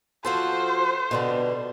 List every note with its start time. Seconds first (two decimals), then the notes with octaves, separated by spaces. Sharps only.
0.25 F3 F#4 A4 C5
1.11 B2 D3 G3